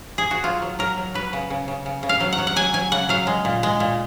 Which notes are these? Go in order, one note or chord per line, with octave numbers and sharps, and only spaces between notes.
G#4
F#4
F#3 F4
F#3
F#3 A#4
F#3
F#3 B4
C#3
C#3
C#3
C#3
C#3
F5
F#3
F#5
F#3
F#5
F#3 G#5
F#3 G#5
C#3 F#5
F#3 F5
G#3
A#2
G#3
A#2